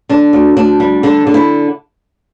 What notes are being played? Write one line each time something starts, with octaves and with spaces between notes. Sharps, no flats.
D3 D4
D2
D2 D4
G3
D3 D4
D3
E4